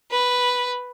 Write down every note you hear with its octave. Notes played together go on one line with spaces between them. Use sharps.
B4